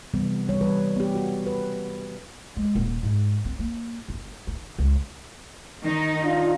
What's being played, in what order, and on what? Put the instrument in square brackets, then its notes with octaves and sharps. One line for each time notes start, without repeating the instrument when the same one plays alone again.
[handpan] C3 E3 G3 B3
G3 C#5
E3 G3 B4
B3 G4
F#4
B4
[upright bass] G#3
D#1
G#2
C4
A#3
G1
D#3
C#2
[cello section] D#3 D#4
[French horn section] D4 F4